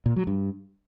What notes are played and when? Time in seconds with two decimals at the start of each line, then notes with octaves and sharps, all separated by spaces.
0.06 A#2
0.16 F#3
0.27 G2